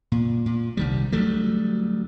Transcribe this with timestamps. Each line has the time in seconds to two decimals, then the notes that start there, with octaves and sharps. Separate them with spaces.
0.12 A#2
0.46 A#2
0.77 C2 D#3 G3
1.12 D2 F#3 G3 A3